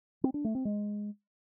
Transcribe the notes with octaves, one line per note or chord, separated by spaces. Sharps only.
C4
D4
A3
C4
G#3